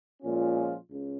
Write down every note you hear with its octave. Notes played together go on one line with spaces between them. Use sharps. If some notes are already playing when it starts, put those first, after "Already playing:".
A#2 F3 G#3 C#4 F4
C#2 C#3